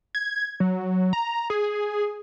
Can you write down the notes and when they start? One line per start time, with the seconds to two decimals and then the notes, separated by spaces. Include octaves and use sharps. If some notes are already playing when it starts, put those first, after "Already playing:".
0.15 G#6
0.60 F#3
1.13 A#5
1.50 G#4